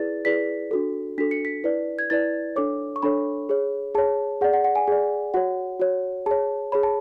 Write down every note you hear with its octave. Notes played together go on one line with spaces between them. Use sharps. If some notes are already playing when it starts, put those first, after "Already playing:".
Already playing: E4 G#4 B4 D5 A6
E4 G#4 B4 D5 B6
D4 F#4 A4
D4 F#4 A4 B6
C#7
B6
E4 B4 D5
G#6
E4 B4 D5 A6
D4 A4 C#5 D6
C#6
D4 A4 C#5 B5
G#4 C#5
G#4 C#5 A5
G#4 D5 F#5
F#5
F#5
G#5
G#4 D5
F#4 C#5 F#5
F#4 C#5
G#4 C#5 A5
G#4 C#5 B5
A5